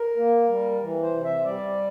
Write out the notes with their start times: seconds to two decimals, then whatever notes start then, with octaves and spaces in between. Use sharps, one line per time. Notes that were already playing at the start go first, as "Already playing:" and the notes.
Already playing: A#4
0.17 A#3
0.49 G3
0.82 E3
1.03 C5
1.13 C3
1.24 E5
1.44 G3 D5